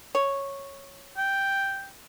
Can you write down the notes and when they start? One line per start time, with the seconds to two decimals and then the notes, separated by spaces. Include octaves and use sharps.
0.15 C#5
1.17 G5